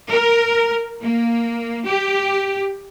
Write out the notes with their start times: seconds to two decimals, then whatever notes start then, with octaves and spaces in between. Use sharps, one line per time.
0.10 A#4
1.02 A#3
1.87 G4